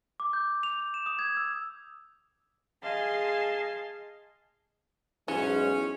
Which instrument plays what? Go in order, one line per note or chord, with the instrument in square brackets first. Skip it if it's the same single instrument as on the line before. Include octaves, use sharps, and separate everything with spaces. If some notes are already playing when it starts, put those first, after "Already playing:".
[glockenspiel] D6
G6
F7
E7
D#6
G#6
E6
[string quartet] G#4 D#5 F5 A5 C6
[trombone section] B1 G#2 G#3 [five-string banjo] E3 [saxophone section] C#4